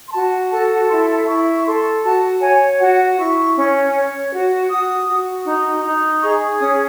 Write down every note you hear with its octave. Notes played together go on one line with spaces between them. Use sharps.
C6
F#4 A5
A4 A5
E4 C6
E4 C#6
C#6
A4 C6
F#4 A5
C#5 G#5
F#4 F#5
E4 C#6
C#4
C#5
F#4
F#4 D#6
F#4
D#4
D#4
G#4 C#6
C#4 D#6